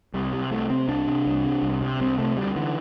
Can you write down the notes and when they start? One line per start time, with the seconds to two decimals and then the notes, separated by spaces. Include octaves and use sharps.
0.14 C2 G3
0.33 C3
0.51 C2 A3
0.70 C3 C4
0.88 C2 D4
1.07 C3
1.26 C2
1.45 C3
1.63 C2
1.81 C3
2.01 C2 C4
2.18 C3 A3
2.37 D2 G3
2.56 D3 E3